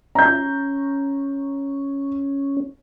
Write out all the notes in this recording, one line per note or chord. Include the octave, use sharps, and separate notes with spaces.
C#4 A#5 G6